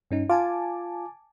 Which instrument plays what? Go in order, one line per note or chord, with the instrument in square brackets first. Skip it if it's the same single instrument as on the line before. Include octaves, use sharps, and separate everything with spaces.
[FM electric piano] G2 C#4 D#4
[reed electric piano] F4 [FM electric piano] G#5 A5 D6